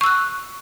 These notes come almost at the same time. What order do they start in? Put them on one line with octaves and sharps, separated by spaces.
C#6 E6 F#6